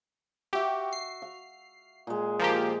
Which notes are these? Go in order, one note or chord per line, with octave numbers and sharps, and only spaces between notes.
F#4 G4 E5
C7
F5
A#2 G#3
F3 A#3 G4